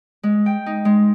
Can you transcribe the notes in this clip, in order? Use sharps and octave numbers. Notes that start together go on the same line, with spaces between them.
G#3
G5
D#4
G#3